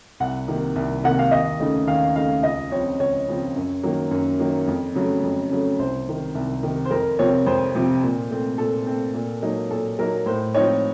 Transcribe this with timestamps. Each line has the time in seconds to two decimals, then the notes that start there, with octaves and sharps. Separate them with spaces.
0.20 C2 F#5
0.48 C3 D#3 A#3
0.76 C2
1.04 C3 D#3 A#3 F#5
1.19 F5
1.31 D#2 D#5
1.60 C#3 A3 D#4
1.87 D#2 F5
2.16 C#3 A3 D#4 F5
2.43 C#2 D#5
2.71 C#3 F3 C4 C#5
2.99 C#2 C#5
3.28 C#3 F3 C4
3.56 F#2
3.83 D#3 F#3 A#3
4.11 F#2
4.39 D#3 F#3 A#3
4.68 F2
4.95 C#3 F#3 A3
5.23 F2
5.51 C#3 F#3 A3
5.79 C2 C5
6.07 C3 D#3
6.35 C2
6.63 C3 D#3
6.85 C5
6.91 F2 A#4
7.19 C3 F3 C4 C#5
7.46 F2 C5
7.75 C3 F3 C4
8.03 A#2
8.30 A3 C4
8.58 A#2 A4
8.87 A3 C4
9.14 A#2
9.42 F#3 A#3 D#4
9.71 A#2 A4
9.99 F#3 A#3 D#4 A#4
10.26 A2 C5
10.54 F3 C4 D#4 C#5